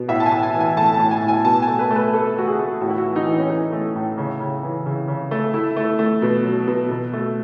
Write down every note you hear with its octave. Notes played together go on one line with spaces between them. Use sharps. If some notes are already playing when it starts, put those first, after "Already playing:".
Already playing: B2
A2 E5
A5
G#5
A2
G#5
E3
G#5
A3 A5
A5
A2
G#5
A2
G#5
B2 A5
G#5
A3
B4
A3
B4
A3 A4
A3 F#4
G#4
A3
A2 F#4
E4
F#4
E3
D#4
E3
C#4
E3 D#4
A3
A2
C#3
C#3
E3
C#3
C#3
A3
A3 E4
A3
A3
B2
F#3
B2
B2
A3